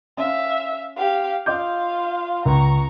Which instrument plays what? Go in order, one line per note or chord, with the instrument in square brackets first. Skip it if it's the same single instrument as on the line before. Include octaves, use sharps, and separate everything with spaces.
[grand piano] C#4 [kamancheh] E5 F5
[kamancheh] G4 F5
[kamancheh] F4 F5 [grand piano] D#5 D6 G6
[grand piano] C#2 [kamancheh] A#5 C#6